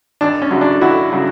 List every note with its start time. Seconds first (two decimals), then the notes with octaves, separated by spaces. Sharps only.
0.21 G#1 D4
0.42 C#4
0.51 F#2 C#3 F#3
0.61 D4
0.81 G#1 E4 F#4
1.12 C#3 F#3